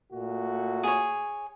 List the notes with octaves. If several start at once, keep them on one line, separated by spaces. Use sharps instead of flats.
A#2 A3 F#4
G#4 C#5